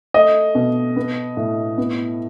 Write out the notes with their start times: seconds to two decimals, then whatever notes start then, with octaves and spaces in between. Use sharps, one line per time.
0.14 A3 D#5
0.55 B2
0.96 B3
1.37 A2
1.78 B3